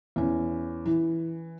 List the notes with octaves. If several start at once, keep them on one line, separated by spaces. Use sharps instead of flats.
E2 C#4
E3